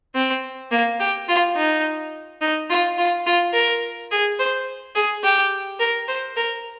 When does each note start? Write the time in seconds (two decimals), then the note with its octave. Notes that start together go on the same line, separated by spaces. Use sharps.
0.15 C4
0.72 A#3
1.00 G4
1.28 F4
1.56 D#4
2.41 D#4
2.70 F4
2.98 F4
3.26 F4
3.54 A#4
4.11 G#4
4.39 C5
4.95 G#4
5.24 G4
5.80 A#4
6.08 C5
6.36 A#4